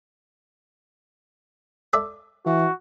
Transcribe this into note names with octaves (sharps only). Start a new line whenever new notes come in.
A4 D5 E5
E3 F#4